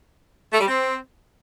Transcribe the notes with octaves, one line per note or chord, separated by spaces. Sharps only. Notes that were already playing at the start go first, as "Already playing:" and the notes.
A3
G3
C4